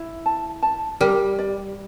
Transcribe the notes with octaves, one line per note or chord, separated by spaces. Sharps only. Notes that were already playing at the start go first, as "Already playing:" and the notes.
Already playing: E4
A5
A5
G3 A#4
D5